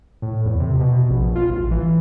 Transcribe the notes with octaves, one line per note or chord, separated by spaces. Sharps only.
A2
E2
C3
B2
A#1
F4
A1
E3